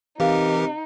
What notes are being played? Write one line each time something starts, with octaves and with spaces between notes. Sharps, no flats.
C3 E3 D#4 G4 A#4 F5